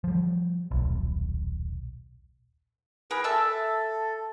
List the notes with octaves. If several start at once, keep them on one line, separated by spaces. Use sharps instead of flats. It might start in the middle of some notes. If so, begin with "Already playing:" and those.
F3 G3
D#1 B1
G#4 A#4 B4
A4 E5 A5 E6